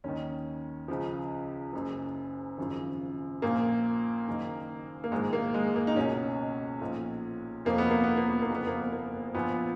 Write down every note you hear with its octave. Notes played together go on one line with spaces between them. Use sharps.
D#2 D#3 C#4
C#2 C#3 F3
F#1 F#2 C#3
G#1 F#2 C#3 F3
A#1 A#2 F3 A#3
F#1 F#2 D#3
A#3
A#1 G#2 D#3 G#3
A#3
G#3
A#3
D#4
C#2 B2 C#4
B1 A#2 F3
F1 F2 F3 A#3
B3
A#3
B3
A#3
B3
A#3
F#1 F2 F3 B3
A#3
B3
A#3
A#1 A#2 F3 B3